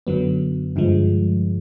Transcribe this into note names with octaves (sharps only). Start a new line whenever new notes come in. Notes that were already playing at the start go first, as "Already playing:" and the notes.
F#2 D3 F#3 B3
G2 D3 F3 G#3